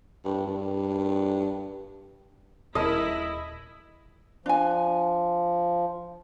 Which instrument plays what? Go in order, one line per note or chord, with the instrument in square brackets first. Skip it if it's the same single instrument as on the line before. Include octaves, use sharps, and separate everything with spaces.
[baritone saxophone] G2
G2
[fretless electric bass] D#1 [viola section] E4 [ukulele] G#4 A#4 A5 [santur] D#5
[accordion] F3 [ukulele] D4 G#5